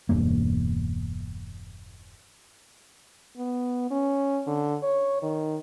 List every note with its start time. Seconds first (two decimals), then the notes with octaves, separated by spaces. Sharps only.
0.09 E1 E2 G2 A#3
3.37 B3
3.91 C#4
4.47 D3
4.83 C#5
5.23 D#3